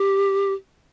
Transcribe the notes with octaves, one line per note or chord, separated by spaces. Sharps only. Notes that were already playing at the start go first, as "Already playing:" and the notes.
Already playing: G4